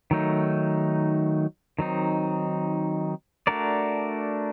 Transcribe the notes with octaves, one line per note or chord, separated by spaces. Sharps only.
D#3 F#3 A3 D#4
D#3 F#3 C4 D#4
A3 D4 F#4 A#4 D5